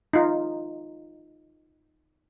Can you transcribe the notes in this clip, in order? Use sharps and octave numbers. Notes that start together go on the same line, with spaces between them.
D#4 F4